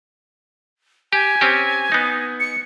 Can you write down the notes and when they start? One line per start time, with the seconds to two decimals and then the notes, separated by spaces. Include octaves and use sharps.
1.13 G4 G#5
1.41 C4 C#4 G4
1.92 B3 D#4
2.40 C#7